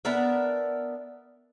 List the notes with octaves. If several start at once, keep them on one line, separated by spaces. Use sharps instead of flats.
B3 D4 A#4 E5